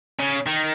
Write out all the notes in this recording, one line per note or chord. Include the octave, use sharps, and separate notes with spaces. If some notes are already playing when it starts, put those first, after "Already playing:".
C#3
D#3